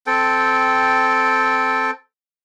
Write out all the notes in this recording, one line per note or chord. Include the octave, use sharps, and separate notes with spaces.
C4 A4 G5